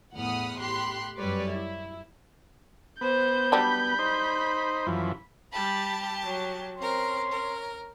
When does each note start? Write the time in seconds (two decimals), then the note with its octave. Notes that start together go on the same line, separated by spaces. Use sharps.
0.14 E2 A2 F#5 B5 D#6 F6
0.59 A2 G4 B5 C6 F#6
1.17 F#2 G3 B4 C#5 D5
1.52 E4
3.01 B3 C5 G6
3.52 F#3 G3 D4 B5
3.99 D#4 C5
4.87 F#2 E3 F3
5.53 G3 G4 A5 B5
6.23 F#3
6.78 C4 C#4 A#4 C6
7.31 A#4